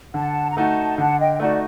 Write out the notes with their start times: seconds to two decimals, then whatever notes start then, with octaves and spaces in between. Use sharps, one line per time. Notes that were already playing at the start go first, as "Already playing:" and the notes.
0.14 D3 F#5 A5
0.49 A#5
0.56 A3 D#4 F#4 F#5 A5
0.98 D3 F#5 A5
1.19 D#5 G5
1.40 A3 D#4 F#4 D5 F#5